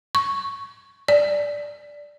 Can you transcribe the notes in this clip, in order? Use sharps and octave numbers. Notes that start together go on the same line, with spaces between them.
C#6
D5